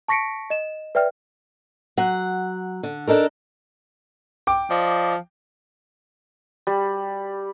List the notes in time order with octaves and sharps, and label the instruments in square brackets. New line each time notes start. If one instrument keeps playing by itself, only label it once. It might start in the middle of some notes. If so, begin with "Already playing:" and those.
[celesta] A5 C#6 A#6 B6 C#7 D7
D#5 E7
B4 D5 E5 G5 F6
[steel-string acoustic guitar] F#3 F#5
D3
D4 D#4 A4 A#4
[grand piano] G5 D6
[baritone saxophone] F3 [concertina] F4 D5 D#5
[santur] G3